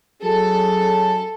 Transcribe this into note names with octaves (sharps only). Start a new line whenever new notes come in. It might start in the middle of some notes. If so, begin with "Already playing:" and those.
F#3 C#4 G#4 A4